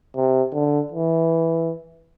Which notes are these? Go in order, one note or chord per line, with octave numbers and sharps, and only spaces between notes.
C3
D3
E3